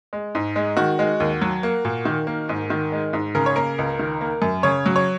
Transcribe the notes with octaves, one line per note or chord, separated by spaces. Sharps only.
G#3
G#2
G#3
D#3 F#4
G#3
D#2
F#3
A#3
A#2
D#3
A#3
G#2
D#3
G#3
G#2
C#3 A#4
C#5
A#3 A#4
C#2
D#3
A#3
F#2
C#3 C#5
F#3
C#5